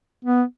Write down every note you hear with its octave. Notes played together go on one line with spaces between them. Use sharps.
B3